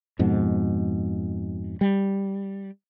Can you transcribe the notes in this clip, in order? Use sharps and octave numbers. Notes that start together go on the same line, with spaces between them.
F2 G#2 B2
G3